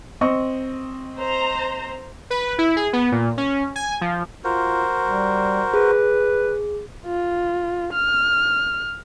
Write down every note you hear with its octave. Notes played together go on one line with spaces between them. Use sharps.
C4 D#5 C#6
C5 A#5
B4
E4
G#4
B3
A#2
C#4
G#5
F3
F4 F#4 A#4 C5
G3
G#4 B4
F4
F6